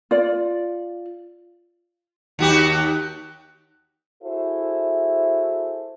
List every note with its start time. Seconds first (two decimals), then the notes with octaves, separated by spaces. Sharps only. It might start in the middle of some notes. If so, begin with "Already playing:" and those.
0.11 F4 D5
2.39 D#2 F#4 G4
4.23 E4 F#4 G#4 A4 C5 E5